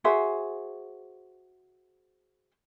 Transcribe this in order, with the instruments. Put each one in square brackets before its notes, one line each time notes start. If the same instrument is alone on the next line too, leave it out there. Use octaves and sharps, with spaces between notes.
[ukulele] F#4 G#4 C5 E5